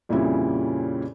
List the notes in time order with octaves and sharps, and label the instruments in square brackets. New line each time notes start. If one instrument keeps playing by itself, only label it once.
[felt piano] F2 A#2 C#3 G3 C#4 E4